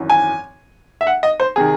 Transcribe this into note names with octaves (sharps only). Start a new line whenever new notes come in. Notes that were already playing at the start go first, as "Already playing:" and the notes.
Already playing: G#1 F#2 E3
G#5
E5
F#5
D#5
C5
C3 D#3 G#4